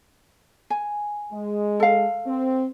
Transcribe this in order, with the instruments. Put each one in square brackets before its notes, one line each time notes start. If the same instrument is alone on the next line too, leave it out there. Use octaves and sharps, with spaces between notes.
[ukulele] G#5
[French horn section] G#3
[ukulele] A4 F5
[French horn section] C4